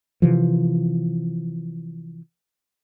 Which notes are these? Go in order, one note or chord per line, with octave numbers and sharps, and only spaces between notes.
C3 E3 F3